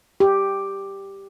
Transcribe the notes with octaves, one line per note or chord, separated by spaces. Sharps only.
G4